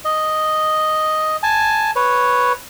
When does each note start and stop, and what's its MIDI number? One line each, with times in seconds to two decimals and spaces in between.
0.05 1.37 75
1.43 1.91 80
1.43 1.91 81
1.96 2.53 71
1.96 2.53 73